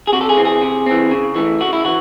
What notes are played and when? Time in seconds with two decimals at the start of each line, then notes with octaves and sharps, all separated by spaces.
0.07 G#4
0.12 C3 F#4
0.21 A4
0.29 G#4
0.37 E3 C4
0.45 G#4
0.62 C3
0.86 E3 C4
1.11 C#3
1.35 E3 A3
1.60 C#3 F#4
1.73 E4
1.85 E3 F#4